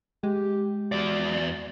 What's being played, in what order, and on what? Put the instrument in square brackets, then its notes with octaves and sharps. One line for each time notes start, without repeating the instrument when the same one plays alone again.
[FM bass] G#3 [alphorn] G4
[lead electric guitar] E2 D5 [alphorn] F#4